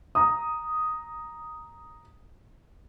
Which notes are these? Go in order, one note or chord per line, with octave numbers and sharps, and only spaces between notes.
A#5 D#6